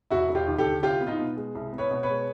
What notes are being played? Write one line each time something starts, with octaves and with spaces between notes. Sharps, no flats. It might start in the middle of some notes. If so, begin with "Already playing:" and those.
E1 E4 F#4
E1
F4 G4
D#2
G4 A4
D3
C2 F4 G4
B3
D#4 F4
B2
G#3
C2
B3
B4 C#5
B2
B4 C#5
G#3